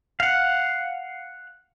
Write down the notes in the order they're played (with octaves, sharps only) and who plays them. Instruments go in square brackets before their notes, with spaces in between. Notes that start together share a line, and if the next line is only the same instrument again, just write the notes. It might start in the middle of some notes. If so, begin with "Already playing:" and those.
[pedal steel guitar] F5 F#5